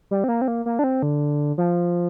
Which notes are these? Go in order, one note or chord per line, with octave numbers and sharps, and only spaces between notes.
G3
C4
A#3
C4
A#3
A#3
D4
C4
D3
F3